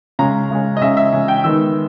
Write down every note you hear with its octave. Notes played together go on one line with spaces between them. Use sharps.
C#3 G#3 C#4 A#5
C#3 G#3 C#4
D#5
C#3 G#3 C#4 E5
E5
C#3 G#3 C#4
G5
D#3 G#3 B3 D#4 E6